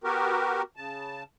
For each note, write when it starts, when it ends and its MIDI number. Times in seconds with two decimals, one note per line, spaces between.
0.04 0.62 59
0.04 0.62 66
0.04 0.62 67
0.04 0.62 70
0.76 1.23 49
0.76 1.23 81